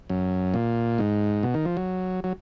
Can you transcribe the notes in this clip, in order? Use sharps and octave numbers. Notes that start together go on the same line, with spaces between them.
F#2
A#2
G#2
B2
D#3
F3
F#3
F#3